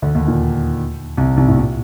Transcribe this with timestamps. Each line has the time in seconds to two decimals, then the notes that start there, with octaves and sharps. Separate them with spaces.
0.02 D2 D3
0.15 D#2 D#3
0.28 A#2
1.17 C2 C3
1.37 C2 C3
1.48 A2
1.57 A#2